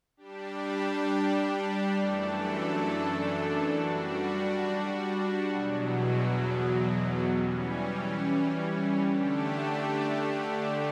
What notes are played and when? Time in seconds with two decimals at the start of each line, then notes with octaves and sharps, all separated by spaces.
0.17 G3 D4 G4
1.94 F#2 E3 A3 D4 A4
3.70 G3 D4 F#4
5.48 E2 B2 F#3
7.24 E3 G3 C#4
9.01 D3 A3 D4 G4